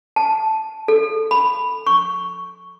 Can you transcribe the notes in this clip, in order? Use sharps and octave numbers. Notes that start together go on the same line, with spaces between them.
A5
A4
B5
C#6